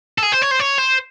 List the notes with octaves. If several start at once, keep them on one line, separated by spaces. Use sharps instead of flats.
A4
G#4
C5
C#5
C5
C#5
C5